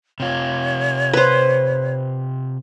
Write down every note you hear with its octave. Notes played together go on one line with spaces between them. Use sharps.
C3 F4 C#5
B4 C5